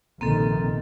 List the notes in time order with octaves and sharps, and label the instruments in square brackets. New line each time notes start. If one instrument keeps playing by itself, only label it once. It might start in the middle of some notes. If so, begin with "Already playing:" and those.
[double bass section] A#1 C3 D#3 [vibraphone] A#3 C4 A4